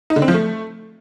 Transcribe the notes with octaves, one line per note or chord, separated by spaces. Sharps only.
D#4
D3
C4
F3
A3